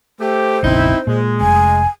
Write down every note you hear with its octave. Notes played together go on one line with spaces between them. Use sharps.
A3 G4 C5
F1 A#1 C#3 C4 D#4 E4
A#2 G#3
F1 G#5